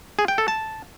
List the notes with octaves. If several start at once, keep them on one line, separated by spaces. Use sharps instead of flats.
G#4
G5
A4
A5